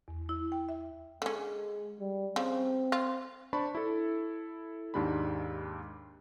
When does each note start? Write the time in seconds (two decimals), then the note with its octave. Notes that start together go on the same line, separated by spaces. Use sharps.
0.08 E2
0.29 E4
0.52 G5
0.69 E5
1.22 D3 G#3 C#4
2.00 G3
2.36 C#3 F3 C4
2.92 F4
3.53 D4 C5 D5 A5 B5 C#6
3.75 E4 A4
4.94 D#2 G#2 D4 G4 B5